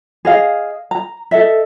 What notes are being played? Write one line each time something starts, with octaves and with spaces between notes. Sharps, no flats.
G#4 D#5 F5
A#5
A4 D#5 E5